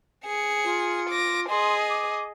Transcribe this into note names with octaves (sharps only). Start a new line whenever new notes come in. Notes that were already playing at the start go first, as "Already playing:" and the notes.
G#4 C#7
F4
D6 A#6
G#4 D#5 C6
D6